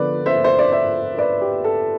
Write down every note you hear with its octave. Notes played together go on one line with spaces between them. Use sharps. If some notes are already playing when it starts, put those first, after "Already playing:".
Already playing: D3 F3 B3 B4 D5
C5 E5
C5
D5
C5 E5
B4 D5
G4
A4